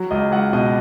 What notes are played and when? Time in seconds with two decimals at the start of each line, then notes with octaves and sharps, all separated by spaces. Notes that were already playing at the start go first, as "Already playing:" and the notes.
Already playing: F#3
0.11 C#2 D#5
0.31 C#2 F#5
0.53 B2 D#5